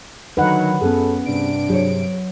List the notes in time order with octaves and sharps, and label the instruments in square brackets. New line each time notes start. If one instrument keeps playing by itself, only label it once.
[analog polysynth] D3 D#3 F#3 [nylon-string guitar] D#4 A#4 F5 [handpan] B4 F#5
[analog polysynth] F#2 [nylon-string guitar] B3 C#4 G#4 [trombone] A4
[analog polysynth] G2 C3 D7 [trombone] D4
[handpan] F#3 [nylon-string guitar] G#4 C5 C#5